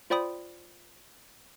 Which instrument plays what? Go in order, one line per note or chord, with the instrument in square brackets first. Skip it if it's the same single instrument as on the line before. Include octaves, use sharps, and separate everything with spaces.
[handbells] F4 C5 D5 G5 B5 D#6